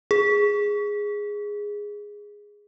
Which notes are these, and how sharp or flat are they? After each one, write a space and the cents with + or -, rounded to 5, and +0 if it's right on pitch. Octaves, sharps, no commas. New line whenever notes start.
G#4 -5